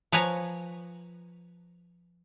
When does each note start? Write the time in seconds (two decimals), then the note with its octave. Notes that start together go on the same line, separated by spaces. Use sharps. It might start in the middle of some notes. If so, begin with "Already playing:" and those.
0.12 F3 B4 C#5 G#5 A#5